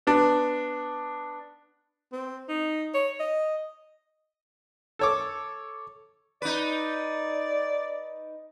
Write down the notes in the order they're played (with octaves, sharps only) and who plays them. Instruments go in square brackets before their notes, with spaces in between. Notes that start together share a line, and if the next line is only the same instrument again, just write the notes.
[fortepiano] B3 D4
[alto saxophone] C4
D#4
C#5
D#5
[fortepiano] A4 C#5 D6
[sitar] D#4 B4 [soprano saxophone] D5